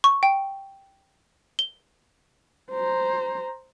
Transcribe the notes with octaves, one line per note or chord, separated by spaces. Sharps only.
C#6
G5
G7
C5 A#5